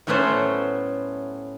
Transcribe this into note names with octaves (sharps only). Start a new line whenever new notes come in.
A2 F#3 A3 B3 C#4 C5